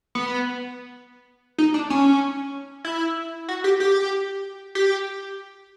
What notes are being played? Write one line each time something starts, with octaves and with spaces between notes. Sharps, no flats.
B3
D#4
D4
C#4
E4
F#4
G4
G4
G4